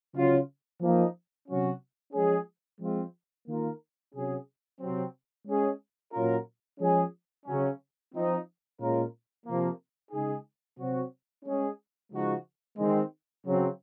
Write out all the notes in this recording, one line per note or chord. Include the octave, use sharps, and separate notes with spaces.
C#3 F#3 C#4 F4
F3 A#3 D#4
C3 F#3 C#4 F#4
F3 G#3 C#4 G#4
F3 G#3 C4 F4
D#3 A#3 F4 A#4
C3 F#3 C#4 G#4
C3 F#3 C4
G#3 C#4 G#4
A#2 F#3 C#4 F4 A#4
F3 G#3 C#4 G#4
C#3 F#3 C#4
F3 C4 D#4
A#2 G#3 C#4 F4 A#4
C3 F3 A#3
C#3 G#3 D#4 G#4
C3 F#3 C4 F#4
G#3 C#4 G#4
C#3 F3 G#3 D#4 F#4
D#3 G#3 C4
C#3 F#3 C4